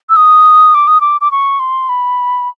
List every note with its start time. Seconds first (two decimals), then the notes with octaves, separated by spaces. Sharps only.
0.10 E6
0.16 D#6
0.75 D6
0.88 D#6
1.01 D6
1.21 D6
1.32 C#6
1.60 C6
1.89 B5